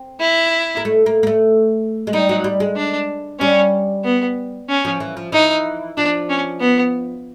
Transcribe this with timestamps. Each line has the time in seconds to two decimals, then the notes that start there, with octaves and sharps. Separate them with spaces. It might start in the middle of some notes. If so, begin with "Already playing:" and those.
Already playing: C4
0.20 E4
0.77 A#3
0.85 A3
1.06 A#3
1.23 A#3
1.27 A3
2.07 G#3
2.13 G3 D#4
2.29 F#3
2.44 G3
2.60 G#3
2.76 D4
3.40 G3 C#4
4.04 B3
4.69 C#4
4.85 F3
5.00 E3
5.17 F3
5.32 E3 D#4
5.97 F3 D4
6.29 C#4
6.60 B3